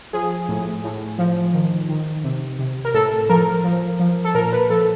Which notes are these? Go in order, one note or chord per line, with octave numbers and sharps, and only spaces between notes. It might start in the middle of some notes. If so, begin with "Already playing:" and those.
F3 G#4
A2
A2
F3
D#3
D#3
C3
C3
A#4
A2 A4
F3 A#4
F3
F3
A4
A#2 A#4
B4
F3 A4